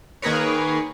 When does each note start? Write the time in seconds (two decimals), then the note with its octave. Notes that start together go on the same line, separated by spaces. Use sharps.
0.22 D#3 A#3 G#4 A#4 B4 C#5